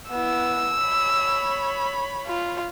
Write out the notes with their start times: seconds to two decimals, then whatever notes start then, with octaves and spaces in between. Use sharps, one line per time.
0.11 B3 E4 E6
0.81 C#5 B5
2.26 F4